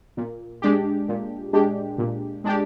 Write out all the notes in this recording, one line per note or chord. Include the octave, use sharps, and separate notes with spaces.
A#2
G#3 D4 G4
A#2
G#3 D4 G4
A#2
G#3 D4 G4